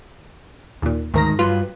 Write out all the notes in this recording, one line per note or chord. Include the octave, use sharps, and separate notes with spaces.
D#2 A#2
D2 G#2 D#3 A#4 A#6
G2 F#3 F4 B4